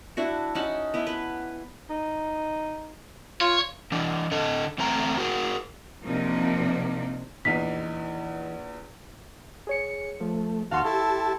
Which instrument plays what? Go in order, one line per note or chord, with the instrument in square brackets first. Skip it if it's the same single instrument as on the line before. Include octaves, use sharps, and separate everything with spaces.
[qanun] D4 E4 F#4
C#4 D#4 F#5 A5
B3 E4
B4
[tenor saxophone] D#4
[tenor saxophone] F4 [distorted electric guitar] C#5
[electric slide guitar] E3 D4
D3 A4 D#5
E2 A3 C4 A#5
F#4 G#4 A#4
[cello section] C3 F3 F#3 A#3 D4 D#4
[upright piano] A#1 E2 [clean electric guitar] E3 D#4 [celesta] B6
[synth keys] G#4 C#5 C#7
[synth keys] F3 [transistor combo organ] A3
[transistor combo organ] D#2 A5 F6 [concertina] F#4 [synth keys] F5 C6 C#6
[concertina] E4 A4 [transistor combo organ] G4 A5 [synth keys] C6